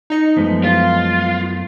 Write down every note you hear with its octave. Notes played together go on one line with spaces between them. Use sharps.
D#4 D#5 C#7
F#2 F3 G#3 A3 B3
F4